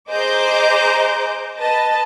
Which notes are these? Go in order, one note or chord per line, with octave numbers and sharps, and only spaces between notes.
G#4 C5 D#5 A#5 D6 G6
B4 D#5 A5